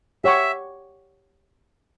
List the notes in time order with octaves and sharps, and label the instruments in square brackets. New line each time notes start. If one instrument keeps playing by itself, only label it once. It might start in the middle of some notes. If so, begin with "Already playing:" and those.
[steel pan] G4 C#5 F#5 C#6 [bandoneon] E5